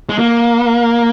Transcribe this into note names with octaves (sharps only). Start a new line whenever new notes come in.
G#3
A#3